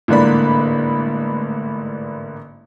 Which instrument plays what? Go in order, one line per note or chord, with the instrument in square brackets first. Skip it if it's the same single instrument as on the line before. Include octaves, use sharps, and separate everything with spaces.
[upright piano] A1 G#2 D3 A#3 D5 B5